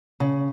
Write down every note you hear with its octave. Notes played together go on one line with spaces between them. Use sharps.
C#3